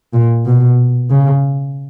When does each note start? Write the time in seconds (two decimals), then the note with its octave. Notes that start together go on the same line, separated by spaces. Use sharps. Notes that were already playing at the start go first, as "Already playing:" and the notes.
0.14 A#2
0.46 B2
1.10 C#3